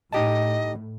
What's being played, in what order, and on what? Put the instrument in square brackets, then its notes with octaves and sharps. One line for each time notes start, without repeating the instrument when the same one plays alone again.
[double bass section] A2 [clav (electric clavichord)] D#4 G4 A5 [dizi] D#5